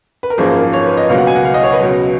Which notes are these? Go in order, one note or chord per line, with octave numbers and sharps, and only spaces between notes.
B4
A#4
G#1 F#2 F3 A#3 G#4
A#4
C#5
B4
D#5
C#2 B2 F#3 A#3 F5
F#5
G#5
F#5
F5
D#5
C#5
B4
C#2 B2 F#3